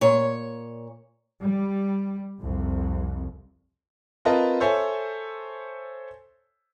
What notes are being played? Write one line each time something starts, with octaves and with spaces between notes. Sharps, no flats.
A#2 C#5
G3
C2 F2
C4 F4 A#4 B4 D#5 A5
A4 C5 C#5 E5 G#5